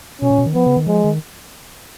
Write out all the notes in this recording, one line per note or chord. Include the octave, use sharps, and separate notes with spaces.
B2 C#4
A#2
B2
D#3
F3 B3
C#3
D#3
F3 G#3
D#3